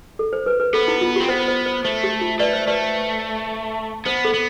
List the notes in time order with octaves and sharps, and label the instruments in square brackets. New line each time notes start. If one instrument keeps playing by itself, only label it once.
[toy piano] A4
C5
B4
B4
[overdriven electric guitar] B3 [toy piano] A4
[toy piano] E4
F4
G4
[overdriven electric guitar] C4
[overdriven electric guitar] B3 [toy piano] C5
[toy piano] C5
C5
[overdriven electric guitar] A3 [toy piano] C5
[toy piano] G4
F4
[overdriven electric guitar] A3 [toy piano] B4 D5
[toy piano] C5
[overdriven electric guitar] A3 [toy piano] B4 D5
[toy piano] C5
[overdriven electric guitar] B3 [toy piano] C5
[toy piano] A4
[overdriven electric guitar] B3